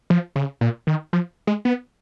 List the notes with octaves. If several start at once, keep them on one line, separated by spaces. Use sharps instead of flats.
F3
C#3
A#2
D#3
F3
G#3
B3